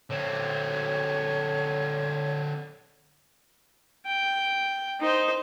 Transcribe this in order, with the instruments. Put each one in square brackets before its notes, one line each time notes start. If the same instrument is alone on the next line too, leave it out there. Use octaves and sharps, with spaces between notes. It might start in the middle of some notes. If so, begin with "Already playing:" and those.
[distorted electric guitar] D3 C4 [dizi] C#5
[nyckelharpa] G5
D#4 C5